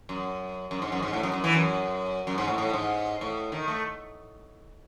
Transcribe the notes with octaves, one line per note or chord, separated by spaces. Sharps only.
F#2
F#2
G#2
F#2
G#2
A2
F#2
F#2
E3
F#2
F#2
G#2
A2
A2
G#2
A2
D#3
A3